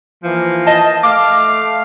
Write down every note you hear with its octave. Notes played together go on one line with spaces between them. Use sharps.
E3 F3 A#3
D#5 A5
A3 F5 D6